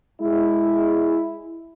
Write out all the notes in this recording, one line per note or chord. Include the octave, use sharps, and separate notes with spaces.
G#3 E4